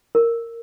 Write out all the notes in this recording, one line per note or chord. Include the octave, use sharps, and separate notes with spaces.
A#4